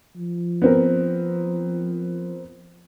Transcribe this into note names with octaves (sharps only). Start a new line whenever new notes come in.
F3
B3 C4 A#4